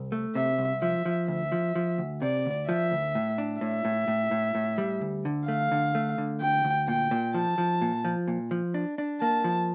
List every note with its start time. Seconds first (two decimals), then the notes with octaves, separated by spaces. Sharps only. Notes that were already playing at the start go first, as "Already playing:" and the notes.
Already playing: C2
0.12 A3
0.35 C3 E5
0.58 C2
0.82 F3 E5
1.05 F3
1.28 D2 E5
1.52 F3
1.75 F3
1.98 D2
2.22 C3 D5
2.46 D2
2.68 F3 E5
2.92 D2
3.15 A2
3.38 D4
3.61 A2 E5
3.85 A2
4.08 A2
4.31 A2
4.55 A2
4.78 G3
5.01 D2
5.25 D3
5.48 A3 F5
5.72 D3
5.95 A3
6.18 D3
6.41 D2 G5
6.65 D2
6.88 A#2 G5
7.11 A#2
7.34 F3 A5
7.58 F3
7.82 A#2
8.05 F3
8.28 A#2
8.51 F3
8.74 D4
8.98 D4
9.21 A#3 A5
9.44 F3